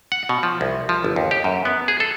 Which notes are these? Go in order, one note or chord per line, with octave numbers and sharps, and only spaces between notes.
F#5
B2
F3
C2
F3
G1
D#2
G4
F#2
B3
G#4
A4